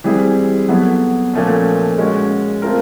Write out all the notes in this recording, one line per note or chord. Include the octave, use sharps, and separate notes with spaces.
E3 G3 C4 E4 G#4
F#3 B3 E4 A4
A#2 F3 A3 C#4
G#3 C#4 F#4
A3 C4 F4 A#4